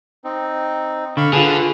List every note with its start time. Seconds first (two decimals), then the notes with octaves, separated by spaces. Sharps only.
0.24 C4 D#4
1.17 D3 F5 B5 C#6
1.33 D3 F4 G#4 B4 A5